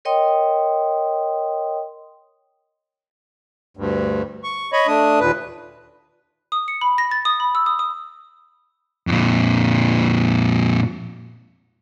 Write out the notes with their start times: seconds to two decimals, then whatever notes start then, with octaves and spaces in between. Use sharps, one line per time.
0.05 A#4 C#5 D#5 G5 C6 D#6
3.77 D2 G2
4.44 C#6
4.73 C#5 D#5 B5 C#6
4.87 A3 D4 D#6
5.20 D#2 A#2 B4
6.52 D#6
6.68 C#7
6.81 B5
6.98 A#6
7.11 A6
7.25 D#6
7.40 B5
7.55 E6
7.66 D#6
7.79 D#6
9.07 F2 A#2